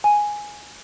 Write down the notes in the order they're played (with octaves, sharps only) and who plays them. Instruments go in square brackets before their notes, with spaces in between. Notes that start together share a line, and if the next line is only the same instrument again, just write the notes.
[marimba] G#5